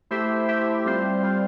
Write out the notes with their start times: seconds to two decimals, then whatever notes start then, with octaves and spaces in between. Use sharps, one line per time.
0.11 A3 E4 G4 C5 E5
0.48 A3 E4 G4 C5 E5
0.85 G3 C4 F4 C5
1.23 G3 C4 F4 C5